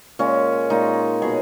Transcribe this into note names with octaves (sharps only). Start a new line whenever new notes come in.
A#2 G#3 C#4
A#2 G#3 D#4
B2 F#3 G#4